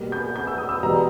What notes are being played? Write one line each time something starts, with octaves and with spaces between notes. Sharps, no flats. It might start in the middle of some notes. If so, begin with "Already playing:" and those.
Already playing: B2 G3 A#3
G6
G6
E6
D#6
E6
E2 B2 G3 B3 A#5